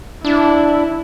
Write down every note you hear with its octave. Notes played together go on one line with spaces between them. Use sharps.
D4 E4